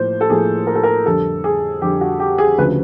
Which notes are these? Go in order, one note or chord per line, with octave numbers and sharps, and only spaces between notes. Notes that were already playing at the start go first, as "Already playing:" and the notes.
Already playing: A2 F3 A#3 C5
A4
A2 F3 A#3 G#4
A#4
A4
A#4
F2 D3 G3 A4
G#4
F2 D3 G3 G4
F#4
G4
G#4
D2 C#3 F3 B4